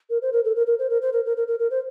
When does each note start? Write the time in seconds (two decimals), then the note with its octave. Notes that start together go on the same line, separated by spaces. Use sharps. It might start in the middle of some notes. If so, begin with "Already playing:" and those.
0.10 A#4
0.22 C5
0.33 A#4
0.44 A4
0.56 A#4
0.67 A#4
0.79 C5
0.90 A#4
1.02 C5
1.13 A#4
1.25 A#4
1.37 A#4
1.48 A#4
1.59 A#4
1.71 C5